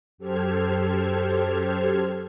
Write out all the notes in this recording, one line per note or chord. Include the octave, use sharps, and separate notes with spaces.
F#2 G4 A4 C5 F6 G#6